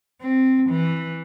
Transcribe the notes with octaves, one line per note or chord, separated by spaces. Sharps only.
C4
E3